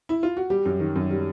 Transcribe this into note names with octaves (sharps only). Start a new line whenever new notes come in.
E4
F4
F#4
G3 G4
F#2
D#3
F#2
G3